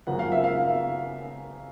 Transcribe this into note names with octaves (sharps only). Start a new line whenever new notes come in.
F#2 C#3 F3 A#3 F#5
F5
E5
F5